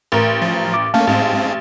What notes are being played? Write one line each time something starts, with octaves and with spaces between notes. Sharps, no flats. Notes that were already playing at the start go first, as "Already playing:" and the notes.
A1 A#4
F3
D6
A3 A#3 C#4 F5 A5
A1 G#2 G#3 C4